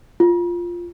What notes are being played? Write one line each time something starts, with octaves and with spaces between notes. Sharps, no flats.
F4